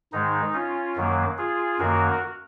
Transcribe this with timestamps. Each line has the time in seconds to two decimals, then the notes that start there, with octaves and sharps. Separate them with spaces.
0.12 G#2 D#3 G#3 D#4
0.54 C#4 F4
0.96 F#2 D#3 F#3 A#3
1.38 F4 G#4
1.79 F#2 D#3 A#3 F#4 A#4